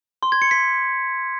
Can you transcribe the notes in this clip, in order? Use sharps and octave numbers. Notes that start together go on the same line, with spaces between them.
C6
G#6
C#7
B6